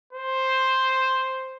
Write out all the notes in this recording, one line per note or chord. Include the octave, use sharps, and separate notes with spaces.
C5